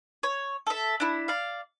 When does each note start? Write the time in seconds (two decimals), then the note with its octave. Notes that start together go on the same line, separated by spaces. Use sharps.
0.23 C#5
0.67 A4 E5
1.00 D4 E4
1.28 D5 F5